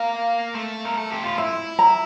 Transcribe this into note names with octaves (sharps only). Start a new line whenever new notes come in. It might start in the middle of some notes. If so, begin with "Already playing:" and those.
Already playing: A#3 F5
A3
A#4
A4
G4
F4
E4 E5
A#5